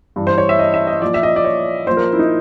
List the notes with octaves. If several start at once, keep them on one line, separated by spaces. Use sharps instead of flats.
G2 E3
C5
C#5
E5
D#5
E5
D#5
A#2 F3 D5
E5
D#5
D5
C#5
A#2 F3 C5
A#4
E4
D#4